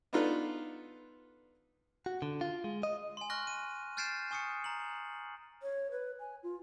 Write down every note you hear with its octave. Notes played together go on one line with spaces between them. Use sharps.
B3 D4 D#4 F4 A4 B4
F#4
D3
F4
G#3
D#5
G#5 C6
C#6 F6 F#6 A#6
D#7
F6 G6 A6 C7 D7 E7
G#5 C#6 D#6 C7 C#7
A#5 F#7
C#5
B4
G#5
F4